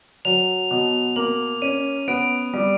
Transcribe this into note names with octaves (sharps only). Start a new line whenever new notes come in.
F#3 F7
B2
A#3 F#7
C#4 D#7
B3 D7
G3